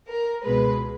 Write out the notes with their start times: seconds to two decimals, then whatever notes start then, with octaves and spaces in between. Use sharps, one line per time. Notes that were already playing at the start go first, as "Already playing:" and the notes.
0.09 A#4
0.44 C#2 B2 G#3 B4